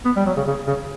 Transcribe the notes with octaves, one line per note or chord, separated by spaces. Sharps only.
B3
G3
F#3
C#3
C#3
C#3